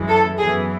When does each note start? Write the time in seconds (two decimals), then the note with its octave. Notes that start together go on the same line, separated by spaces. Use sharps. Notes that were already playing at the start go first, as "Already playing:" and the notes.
Already playing: F#2 E3 G#3
0.08 A4
0.38 F#2 E3 B3 G#4